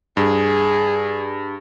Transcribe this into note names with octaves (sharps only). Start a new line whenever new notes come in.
G2 G#4